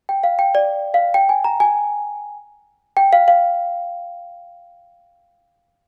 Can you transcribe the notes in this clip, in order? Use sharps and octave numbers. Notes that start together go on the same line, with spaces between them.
G5
F5
G5
D5
F5
G5
G#5
A#5
G#5
G5
F5
F5